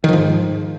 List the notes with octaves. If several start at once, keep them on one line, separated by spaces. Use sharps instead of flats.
G#2 D#3 F3